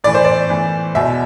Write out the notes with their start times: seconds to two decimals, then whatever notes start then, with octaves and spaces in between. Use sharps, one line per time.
0.04 A2 E3 D5
0.14 C5
0.25 D5
0.50 A2 E3
0.95 E2 B2 E5